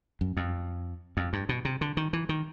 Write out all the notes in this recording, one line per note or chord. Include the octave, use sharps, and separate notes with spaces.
F#2
F2
F2
G2
B2
C3
D3
D#3
E3
D#3